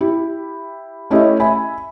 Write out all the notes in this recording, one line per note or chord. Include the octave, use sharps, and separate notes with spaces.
E4 G4
A3 C#4 E4 G4 D#5 E5
E5 G#5 B5